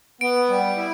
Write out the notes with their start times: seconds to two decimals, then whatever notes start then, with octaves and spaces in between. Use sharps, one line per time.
0.21 B3 D7
0.49 G3
0.77 E4